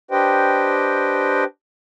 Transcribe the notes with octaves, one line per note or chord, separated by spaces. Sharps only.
D4 G4 B4 C5 D#5 G5